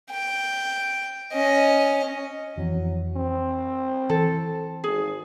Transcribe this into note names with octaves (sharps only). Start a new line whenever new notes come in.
G5
C#4 D#5
F2 E3 F#3
C4
E3 A4
G#1 G#4